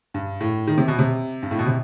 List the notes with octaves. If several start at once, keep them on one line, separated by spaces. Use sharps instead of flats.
G2
A2
D#3
C3
B2
C3
G2
A2
B2
C3